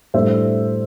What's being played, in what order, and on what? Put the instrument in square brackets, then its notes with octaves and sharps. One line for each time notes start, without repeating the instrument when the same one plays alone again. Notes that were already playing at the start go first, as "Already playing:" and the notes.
[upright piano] A2 G3 D4 C5 E5